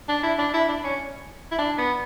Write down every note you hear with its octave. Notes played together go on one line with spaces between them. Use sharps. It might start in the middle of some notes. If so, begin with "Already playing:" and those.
D4
E4
D4
E4
D4
C#4
E4
D4
B3